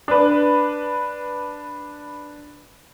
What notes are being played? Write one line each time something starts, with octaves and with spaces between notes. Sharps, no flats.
D4 B4